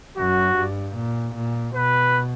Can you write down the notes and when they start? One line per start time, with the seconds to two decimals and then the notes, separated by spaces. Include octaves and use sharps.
0.17 F#2 F#4
0.56 G2
0.95 A#2
1.35 A#2
1.74 B2 B4